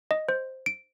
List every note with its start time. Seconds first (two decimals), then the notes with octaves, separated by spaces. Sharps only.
0.11 D#5
0.29 C5
0.66 D7